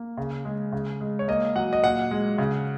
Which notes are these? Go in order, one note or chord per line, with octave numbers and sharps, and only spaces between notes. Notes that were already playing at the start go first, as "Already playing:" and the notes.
Already playing: A#3
C#3
G#3
C#3
G#3
C#5
A#3 D#5
F#3 F#5
D#5
A#2 F#5
G#3
C#3